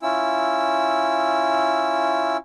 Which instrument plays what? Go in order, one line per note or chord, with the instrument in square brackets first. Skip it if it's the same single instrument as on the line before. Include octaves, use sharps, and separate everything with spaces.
[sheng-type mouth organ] C#4 E4 F4 E6